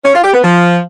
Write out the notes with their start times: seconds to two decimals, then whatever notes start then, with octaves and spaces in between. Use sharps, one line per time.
0.04 C#4
0.14 F4
0.24 G4
0.33 B3
0.43 F3